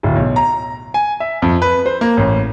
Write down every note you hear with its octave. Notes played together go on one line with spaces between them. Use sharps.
D1
B1
A#5
G#5
E5
F2
B4
C5
A#3
A1